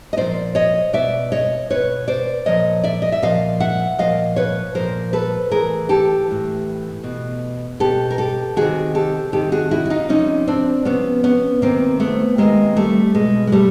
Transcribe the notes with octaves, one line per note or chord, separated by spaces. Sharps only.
D#5
A#2 F3 C5 D5
C#5 D#5
B2 D5 E5
C#5 D#5
B2 B4 C#5
C5 D5
A#2 F3 C#5 D#5
D5 E5
D#5
E5
A#2 F3 D#5 F5
E5 F#5
A#2 F3 D#5 F5
B4 C#5
A#2 F3 A#4 C5
A4 B4
A2 E3 G#4 A#4
G4 A4
A2 E3
B2
B2 G4 A4
A#4
G4 A4
C3 D#3 F#4 G#4
G4 A4
C3 D#3 G4 A4
F#4 G#4
E4 F#4
F#4
D#4 F4
C3 F3 C#4 D#4
C4 D4
C3 F3 B3 C#4
B3 C#4
C3 D#3 A#3 C4
A3 B3
C3 D#3 G#3 A#3
G3 A3
B2 G#3
G#3
G3 A3